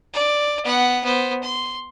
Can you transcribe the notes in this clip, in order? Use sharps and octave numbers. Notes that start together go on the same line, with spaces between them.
D5
B3 F#5
B3 C5
C6